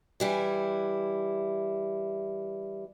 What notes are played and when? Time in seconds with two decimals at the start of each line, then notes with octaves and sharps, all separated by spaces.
0.20 E3 G3 E4